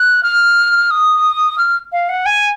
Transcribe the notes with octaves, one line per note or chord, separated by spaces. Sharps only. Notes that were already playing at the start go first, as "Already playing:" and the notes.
Already playing: F#6
F6
D#6
F6
F5
F#5
G#5